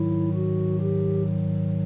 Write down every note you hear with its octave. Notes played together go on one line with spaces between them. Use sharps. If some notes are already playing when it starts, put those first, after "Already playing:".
Already playing: G#2 D#3 F#3 E4
F#4
G4